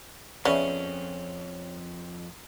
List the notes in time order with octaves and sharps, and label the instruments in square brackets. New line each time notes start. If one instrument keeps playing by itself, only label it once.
[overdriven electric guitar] F2 [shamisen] C#3 B3 [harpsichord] C#4 [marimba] D5 E5